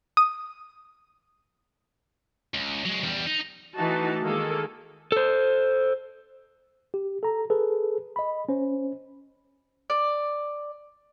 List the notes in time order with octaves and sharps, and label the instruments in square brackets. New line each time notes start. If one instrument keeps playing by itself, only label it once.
[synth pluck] D#6
[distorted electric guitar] C#2
F#3 G#3
E2 G3
D#4
[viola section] E3 A3 D#4 F#4 A5
D#3 G#3 A#3 G#4 A4
[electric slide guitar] A4 C5
[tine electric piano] G4
A4 A#5
G#4 A4 B4
D#5 B5
C#4 C5
[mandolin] D5